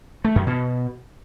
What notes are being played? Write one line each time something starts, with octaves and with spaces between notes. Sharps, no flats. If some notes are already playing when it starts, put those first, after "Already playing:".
A3
F#2
B2